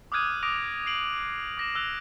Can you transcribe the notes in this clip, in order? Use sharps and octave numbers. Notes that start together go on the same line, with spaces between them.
D6 D#6 F6 F#6 G#6 D#7
D6 D#6 A#6 D7 F7
C7 D7 F#7
D6 A#6 E7
E6 F#6 F7